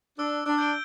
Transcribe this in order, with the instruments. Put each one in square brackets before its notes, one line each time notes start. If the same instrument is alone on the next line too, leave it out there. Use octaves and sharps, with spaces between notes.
[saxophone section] D4 [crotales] E6
[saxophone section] D4
[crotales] G6 D7 G7